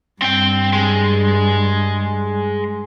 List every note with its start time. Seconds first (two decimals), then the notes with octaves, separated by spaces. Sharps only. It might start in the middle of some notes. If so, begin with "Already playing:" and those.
0.22 G2 C4 G5
0.73 G#3